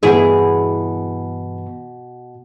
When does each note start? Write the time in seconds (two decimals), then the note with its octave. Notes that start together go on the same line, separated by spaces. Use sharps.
0.03 G2 B2 E3 B3 E4 G#4